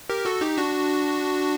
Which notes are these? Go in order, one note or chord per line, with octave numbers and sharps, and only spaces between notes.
G4 A#4
F#4 A4
D#4 G4
D4 F#4